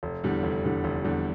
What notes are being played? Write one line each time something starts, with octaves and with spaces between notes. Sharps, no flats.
F1
E2 D3 G3
F1
E2 D3 G3
F1
E2 D3 G3